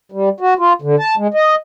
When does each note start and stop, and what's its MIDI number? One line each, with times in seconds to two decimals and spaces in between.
0.12 0.29 55
0.40 0.54 66
0.59 0.73 65
0.82 0.96 50
0.99 1.15 81
1.17 1.27 56
1.34 1.55 75